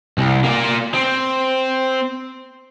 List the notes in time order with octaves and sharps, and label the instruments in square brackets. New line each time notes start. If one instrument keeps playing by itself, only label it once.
[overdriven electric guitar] C2
A#3 D5
C4